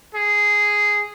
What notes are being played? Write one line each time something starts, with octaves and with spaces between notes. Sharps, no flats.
G#4